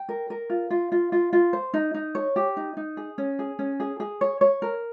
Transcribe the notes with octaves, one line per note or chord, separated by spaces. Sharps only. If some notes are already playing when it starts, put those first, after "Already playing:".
Already playing: G5
A#4
A#4
F4
F4
F4
F4
F4
C5
D#4
D#4
C#5
G4
D#4
D#4
G#4
C#4
G#4
C#4
G#4
G#4
C#5
C#5
A#4